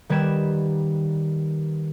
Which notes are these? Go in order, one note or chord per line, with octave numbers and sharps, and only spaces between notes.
D#3 G3 B4 G#6 D7 E7